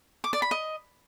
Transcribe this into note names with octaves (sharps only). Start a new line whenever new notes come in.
D6
D5
B5
D#5